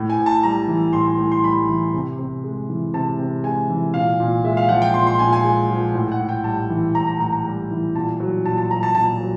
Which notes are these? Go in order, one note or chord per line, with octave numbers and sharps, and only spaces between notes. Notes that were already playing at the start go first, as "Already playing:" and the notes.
Already playing: A2
G#5
A2
A5
G3 A#5
E3
A2 C6
C6
A2
C6
G3 B5
E3
C3
C3
G#3
E3
C3 A5
C3
G#3 G#5
E3
A#2 F5
A#2
G#3 E5
F5
F3 F#5
G5
A#2 C6
C6
A#2 G#5
G#5
G#3
F3
A2
F#5
A2
G5
G3 A5
E3
A2 A#5
A#5
A2 A#5
A#5
G3
E3
A#2 A5
F#3
A#2 A5
A5
F#3 A#5
A5
A#2 A5
F#3